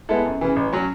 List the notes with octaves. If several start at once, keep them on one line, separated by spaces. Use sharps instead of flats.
G#3 B3 E4 A4
F#2
C#3 E3
A1
F#3 C#4